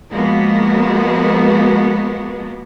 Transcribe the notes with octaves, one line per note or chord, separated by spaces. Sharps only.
F3 G#3 A#3 B3 F#4